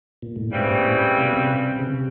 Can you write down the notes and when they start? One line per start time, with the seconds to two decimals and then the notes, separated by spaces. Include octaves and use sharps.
0.22 A#2
0.36 A2
0.50 G#2 C#3 E3 G3 C4
0.67 A#2
0.85 A2
1.18 C3
1.26 B2
1.33 C3
1.79 C#3
1.87 C3